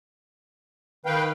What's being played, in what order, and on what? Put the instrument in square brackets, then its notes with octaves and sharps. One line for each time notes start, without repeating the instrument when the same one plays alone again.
[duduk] D#3 [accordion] B4 F5 G5